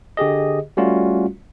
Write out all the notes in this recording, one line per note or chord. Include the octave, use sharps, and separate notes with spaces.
D3 G4 G#4 D#5
G3 A3 C#4 F4 F#4